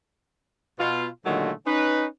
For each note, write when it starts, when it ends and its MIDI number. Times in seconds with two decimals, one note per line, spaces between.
0.79 1.07 47
0.79 1.07 65
1.25 1.52 46
1.25 1.52 50
1.25 1.52 51
1.25 1.52 54
1.25 1.52 56
1.25 1.52 57
1.66 2.06 61
1.66 2.06 63
1.66 2.06 71